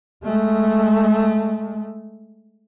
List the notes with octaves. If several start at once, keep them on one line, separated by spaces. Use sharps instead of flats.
G#3 A3